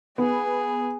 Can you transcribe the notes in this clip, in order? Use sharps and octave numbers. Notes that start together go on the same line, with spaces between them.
B3 G#4